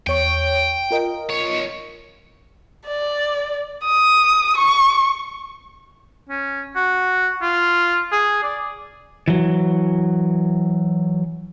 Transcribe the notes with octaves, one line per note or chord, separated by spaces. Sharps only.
E2 C#5 G5 C#6
F4 A#4 D#5
B1 C#5
D5
D#6
C#6
C#4
F#4
F4
G#4
D5
E3 F#3